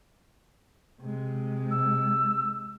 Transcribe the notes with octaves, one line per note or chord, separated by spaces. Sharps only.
C3 G#3
E6